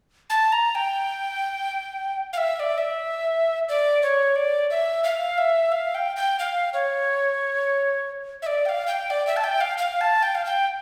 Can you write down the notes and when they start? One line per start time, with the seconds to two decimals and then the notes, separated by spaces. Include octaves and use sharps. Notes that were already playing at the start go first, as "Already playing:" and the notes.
0.30 A5
0.52 A#5
0.75 G5
2.33 F5
2.37 E5
2.56 E5
2.59 D5
2.78 E5
3.69 D5
4.02 C#5
4.35 D5
4.70 E5
5.04 F5
5.38 E5
5.72 F5
5.94 G5
6.16 G5
6.39 F5
6.73 C#5
8.42 E5
8.46 D5
8.65 G5
8.69 F5
8.87 G5
9.10 D5
9.27 E5
9.36 A5
9.44 G5
9.61 F5
9.78 F5
10.01 A5
10.23 G5
10.35 F5
10.45 G5